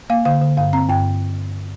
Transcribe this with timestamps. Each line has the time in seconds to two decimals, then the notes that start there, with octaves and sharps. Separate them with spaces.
0.10 A#3 F5
0.25 D3 F5
0.41 D3
0.57 G2 F5
0.73 C4 A#5
0.89 G2 G5